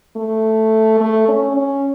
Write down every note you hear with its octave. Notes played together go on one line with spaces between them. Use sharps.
A3
A3
C#4
C#4